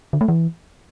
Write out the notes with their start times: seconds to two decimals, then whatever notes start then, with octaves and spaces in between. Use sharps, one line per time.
0.13 D3
0.21 A3
0.28 E3